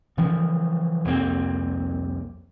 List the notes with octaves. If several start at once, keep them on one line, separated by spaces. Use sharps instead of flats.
C#3 E3 F3
C2 F2 A#3 C4